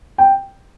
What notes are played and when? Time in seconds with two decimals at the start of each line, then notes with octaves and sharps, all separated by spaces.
0.18 G5